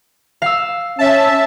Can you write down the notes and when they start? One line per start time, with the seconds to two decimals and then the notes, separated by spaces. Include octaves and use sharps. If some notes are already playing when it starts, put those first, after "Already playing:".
0.42 F5 E6
0.99 C#4 E5 A5